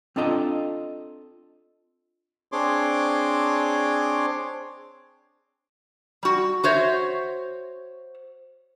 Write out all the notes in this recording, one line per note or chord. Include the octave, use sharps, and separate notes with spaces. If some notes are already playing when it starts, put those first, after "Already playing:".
C4 D4 F4 A4 D#5 A#5
C4 D4 G#4 C#5 C6 D6
G3 F#4
F#4 C5 C#5 E5